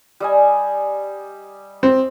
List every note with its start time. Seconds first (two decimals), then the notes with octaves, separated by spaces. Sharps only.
0.20 G3 D#5 G#5
1.83 C4